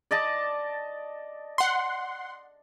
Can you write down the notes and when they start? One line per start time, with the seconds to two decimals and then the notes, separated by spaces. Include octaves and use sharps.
0.11 D5 D#5 A5
1.58 F#5 C6